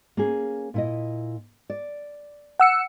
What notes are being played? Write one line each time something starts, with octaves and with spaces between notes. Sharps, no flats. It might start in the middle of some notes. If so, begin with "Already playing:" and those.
A#3 C#4 G#4
A#2 E4 D#5
D5
F#5 E6 C#7